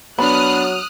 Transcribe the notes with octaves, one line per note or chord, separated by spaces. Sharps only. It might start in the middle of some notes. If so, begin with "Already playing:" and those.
F#3 B3 D4 B5 D#6 F6 F#6